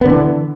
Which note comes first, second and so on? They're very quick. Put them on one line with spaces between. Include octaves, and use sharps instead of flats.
B3 D3 E3